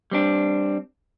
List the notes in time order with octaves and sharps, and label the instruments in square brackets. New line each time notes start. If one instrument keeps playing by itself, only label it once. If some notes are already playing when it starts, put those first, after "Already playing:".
[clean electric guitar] G3 C4 D4